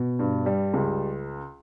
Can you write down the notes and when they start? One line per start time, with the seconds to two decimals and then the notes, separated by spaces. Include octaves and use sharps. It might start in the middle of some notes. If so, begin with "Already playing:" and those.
Already playing: B2
0.19 G2
0.46 G3
0.73 C#2